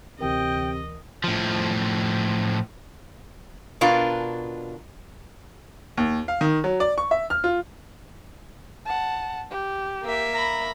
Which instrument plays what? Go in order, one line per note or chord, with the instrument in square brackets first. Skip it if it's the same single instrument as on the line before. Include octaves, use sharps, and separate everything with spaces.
[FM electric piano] D2 E3 A#4 [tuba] C3 [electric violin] D#5 [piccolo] G5
[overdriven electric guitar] A2 F3
[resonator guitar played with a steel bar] B2 D4 F4 A#4 B4
[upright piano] D#2
F5
D#3
F#3
D5
C#6
E5
F6
F4
[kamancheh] F#5 A5
G4
[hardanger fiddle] A#3 E5
[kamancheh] A#5 B5